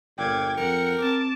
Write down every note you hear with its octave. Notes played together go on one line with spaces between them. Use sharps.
G1 A#2 G5 D6 G#6
F2 A#4 F#5 C#7
C4 A5 D6